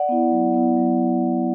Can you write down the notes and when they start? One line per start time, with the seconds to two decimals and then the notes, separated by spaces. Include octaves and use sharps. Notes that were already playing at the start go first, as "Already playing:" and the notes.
Already playing: D5 F#5
0.09 B3 E4
0.31 F#3
0.54 B3 E4
0.77 F#3